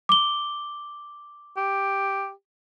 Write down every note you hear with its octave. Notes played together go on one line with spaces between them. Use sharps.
D6 G7
G4